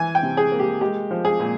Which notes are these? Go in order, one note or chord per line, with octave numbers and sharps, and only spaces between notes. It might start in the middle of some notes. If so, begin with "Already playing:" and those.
Already playing: E3 G#5
G5
C3
G#4
A#3
G4
G#3 G4
F3
G#4
A#2